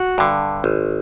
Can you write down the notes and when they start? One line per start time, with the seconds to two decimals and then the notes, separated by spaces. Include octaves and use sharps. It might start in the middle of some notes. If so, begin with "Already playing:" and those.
Already playing: F#4
0.18 G2 D3
0.64 G#1